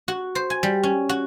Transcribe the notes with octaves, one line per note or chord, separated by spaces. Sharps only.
F#4
C5
G#5
G3
C#4
F#4